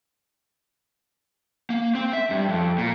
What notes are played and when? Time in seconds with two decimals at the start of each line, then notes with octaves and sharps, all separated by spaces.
1.70 A#3
1.95 C4
2.13 E5
2.30 G2
2.49 F2
2.78 A#2